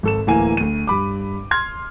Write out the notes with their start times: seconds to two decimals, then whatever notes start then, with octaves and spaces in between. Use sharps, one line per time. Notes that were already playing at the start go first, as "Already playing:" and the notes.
0.03 G#1 A4 E7
0.27 D1 A2 E3 A#3 G#5
0.57 D2 D#7
0.87 G2 B5 D6
1.51 C6 F6 G#6